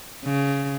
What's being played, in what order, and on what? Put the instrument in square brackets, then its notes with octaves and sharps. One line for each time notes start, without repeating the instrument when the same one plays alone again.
[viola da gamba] C#3